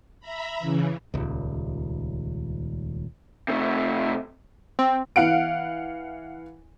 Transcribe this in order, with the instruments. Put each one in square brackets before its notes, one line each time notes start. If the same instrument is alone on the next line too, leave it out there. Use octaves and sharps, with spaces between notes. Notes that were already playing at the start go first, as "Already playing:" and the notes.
[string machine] E5 A#5 B5
C#3 E3
[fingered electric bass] D#1 C#2
[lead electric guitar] C3 A3
[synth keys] C4
[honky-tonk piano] E3 F5 F#5 D7